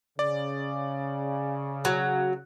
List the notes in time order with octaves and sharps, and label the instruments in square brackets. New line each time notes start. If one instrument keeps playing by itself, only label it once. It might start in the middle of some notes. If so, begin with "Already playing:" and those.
[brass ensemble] C#3 [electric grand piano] D5
[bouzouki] F#3